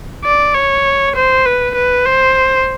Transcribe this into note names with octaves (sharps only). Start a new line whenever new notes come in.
D5
C#5
C5
B4
B4
C5